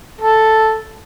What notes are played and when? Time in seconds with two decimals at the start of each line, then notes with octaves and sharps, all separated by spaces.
0.21 A4